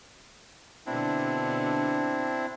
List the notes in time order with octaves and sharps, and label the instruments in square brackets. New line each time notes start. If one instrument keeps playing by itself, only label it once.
[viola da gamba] B2 D3 [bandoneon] C4 D4 E4